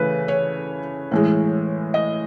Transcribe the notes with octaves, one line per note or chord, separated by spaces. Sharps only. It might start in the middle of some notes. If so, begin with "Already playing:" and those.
Already playing: C#3 E3 A3 B4
C#5
A2 E3 G#3
D#5